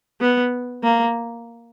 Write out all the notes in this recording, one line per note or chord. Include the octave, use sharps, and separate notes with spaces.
B3
A#3